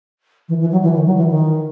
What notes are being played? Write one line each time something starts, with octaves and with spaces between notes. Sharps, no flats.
E3
E3
F#3
E3
D#3
F#3
E3
D#3